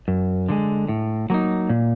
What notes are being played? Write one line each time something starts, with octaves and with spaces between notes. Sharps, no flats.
F#2
D3 F3 G#3
A2
F#3 A#3 D#4
A#2